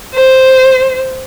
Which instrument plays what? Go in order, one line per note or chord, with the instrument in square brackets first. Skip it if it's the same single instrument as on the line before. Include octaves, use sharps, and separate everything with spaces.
[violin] C5